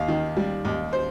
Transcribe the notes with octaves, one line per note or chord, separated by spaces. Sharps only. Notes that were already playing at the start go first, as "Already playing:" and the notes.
Already playing: D#2 F5
D#3
G3
D#2
C5